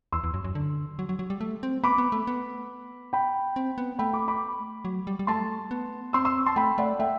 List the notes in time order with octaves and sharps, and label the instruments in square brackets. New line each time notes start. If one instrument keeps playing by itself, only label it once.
[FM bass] E2 [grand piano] C6 E6
[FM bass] E2
F#2
F#2
D3
F#3
F#3
F#3
G3
A3
C4
[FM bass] B3 [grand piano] B5 D6
[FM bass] B3
A3
B3
[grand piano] G5 B5
[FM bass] C4
B3
[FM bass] A3 [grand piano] G5 B5
[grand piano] B5 D6
B5 D6
[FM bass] F#3
G3
G3
[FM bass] A3 [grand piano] A5 C6
[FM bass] B3
[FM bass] C4 [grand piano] C6 E6
[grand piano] C6 E6
A5 C6
[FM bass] A3 [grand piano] G5 B5
[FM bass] A3 [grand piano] D5 F#5
[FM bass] A3 [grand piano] E5 G5